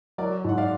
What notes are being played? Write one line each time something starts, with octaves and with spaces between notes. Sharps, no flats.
F#3 A#4 D5
G#2 F#5
D5 F5